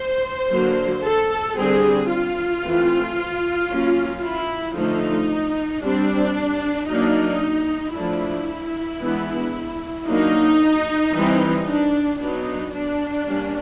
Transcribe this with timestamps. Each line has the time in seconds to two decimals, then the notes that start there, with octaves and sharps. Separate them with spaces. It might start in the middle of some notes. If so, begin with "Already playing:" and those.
Already playing: C5
0.50 D3 F#3 A#3
1.04 A4
1.57 D3 G3 C4 G#4
2.10 F4
2.63 E3 A3 C4
3.70 F#3 A#3 C#4
4.23 E4
4.76 D3 F3 A3 D#4
5.82 G3 C4 D4
6.88 F#3 A#3 D4 D#4
7.95 F3 A3 D4 E4
9.01 E3 G#3 B3 D4
10.07 F#3 A#3 D4 D#4
11.14 E3 G3 C4
11.67 D4
12.20 F#3 B3 D4 D#4
12.73 D4
13.26 G3 A#3 C#4